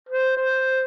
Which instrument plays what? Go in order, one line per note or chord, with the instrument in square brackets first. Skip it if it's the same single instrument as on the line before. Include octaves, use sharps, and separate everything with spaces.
[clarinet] C5
C5